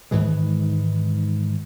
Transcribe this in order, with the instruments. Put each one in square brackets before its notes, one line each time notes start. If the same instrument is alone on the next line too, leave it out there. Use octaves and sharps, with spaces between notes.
[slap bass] G#2 D#3 E3 G#3